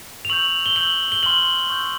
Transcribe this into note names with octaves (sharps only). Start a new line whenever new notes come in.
F7
C#6 E6 G6 F#7
G7
C#6 E6 G6 F#7
G7
C6 F6 F#7
C#6 E6 G6